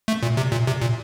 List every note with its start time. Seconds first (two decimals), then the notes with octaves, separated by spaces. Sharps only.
0.08 A3
0.23 A#2
0.37 C3
0.52 A#2
0.67 C3
0.82 A#2